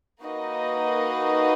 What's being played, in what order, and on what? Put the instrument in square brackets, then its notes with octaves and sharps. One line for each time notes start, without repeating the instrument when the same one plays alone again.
[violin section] A#3 D#4 F#4 B4 D#5